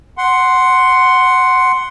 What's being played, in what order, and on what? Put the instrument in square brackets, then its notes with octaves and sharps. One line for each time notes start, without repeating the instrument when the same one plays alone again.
[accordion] F#5 C6